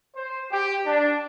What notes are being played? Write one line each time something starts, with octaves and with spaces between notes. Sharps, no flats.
C5
G4
D4